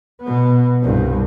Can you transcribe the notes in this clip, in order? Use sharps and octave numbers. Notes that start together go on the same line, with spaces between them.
B2 B3
C2 G2